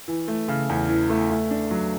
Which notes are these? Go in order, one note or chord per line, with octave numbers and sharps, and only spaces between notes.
E3
A3
C#3
E2
E3
A3
A3
D4
F#3